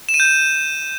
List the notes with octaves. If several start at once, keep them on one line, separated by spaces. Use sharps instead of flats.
E7
D#7
G6
D#7